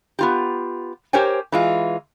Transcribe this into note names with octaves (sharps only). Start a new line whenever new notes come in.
B3 F4 G4
G4 A#4 C5 C#5 G5 G#5
E3 G#3 F4